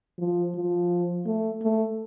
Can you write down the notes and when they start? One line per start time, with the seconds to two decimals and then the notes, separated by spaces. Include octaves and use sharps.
0.18 F3
0.55 F3
1.26 A3
1.62 A3